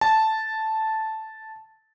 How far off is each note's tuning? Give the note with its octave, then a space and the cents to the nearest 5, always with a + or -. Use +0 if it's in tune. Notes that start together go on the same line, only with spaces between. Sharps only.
A5 -5